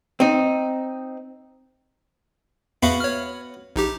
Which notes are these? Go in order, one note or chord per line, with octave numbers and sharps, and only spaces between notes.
C4 D#4
E2 B3 F#4 E5 F5
C#5 F6
A#1 D#4 G4